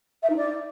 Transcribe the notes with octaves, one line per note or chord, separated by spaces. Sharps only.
E5
D#4
D5